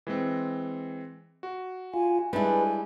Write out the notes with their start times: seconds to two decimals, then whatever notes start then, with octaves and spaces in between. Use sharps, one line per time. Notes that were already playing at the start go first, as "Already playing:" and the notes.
0.07 E3 G#3 C4
1.43 F#4
1.94 F4 G#5
2.33 G3 G#3 D4 E4 G#4 B4 G#5